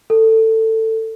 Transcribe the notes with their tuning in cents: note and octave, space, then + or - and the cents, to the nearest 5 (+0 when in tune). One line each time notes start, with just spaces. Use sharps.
A4 +20